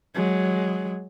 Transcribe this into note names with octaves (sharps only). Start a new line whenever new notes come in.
F#3 G#3